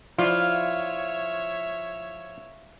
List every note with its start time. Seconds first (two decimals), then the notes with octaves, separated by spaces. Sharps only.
0.18 F3 E4 F4 C#5 D5 E5